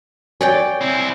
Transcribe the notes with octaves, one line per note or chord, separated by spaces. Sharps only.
C#5 D5 G5 G#5
C4 E4